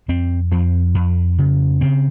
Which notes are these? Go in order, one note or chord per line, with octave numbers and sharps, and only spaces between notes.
F2 C4
F2 C4
F2
C#3
C#3 C4